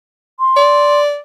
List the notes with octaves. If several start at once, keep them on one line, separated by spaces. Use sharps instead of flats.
C6
D5